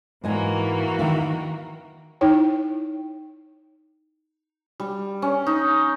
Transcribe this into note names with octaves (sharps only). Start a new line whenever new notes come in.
G#2 E3 A#3 F#4 D#5 G#5
D#3 E5 F5
D#4 E4 C#5 G5
G3
C#4
D#4